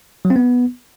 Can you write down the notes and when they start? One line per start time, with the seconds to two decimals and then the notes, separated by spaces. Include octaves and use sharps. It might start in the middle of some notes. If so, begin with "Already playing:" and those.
0.25 F#3
0.30 C4
0.36 B3